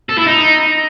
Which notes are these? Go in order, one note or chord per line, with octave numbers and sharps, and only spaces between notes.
A4
E4
D#4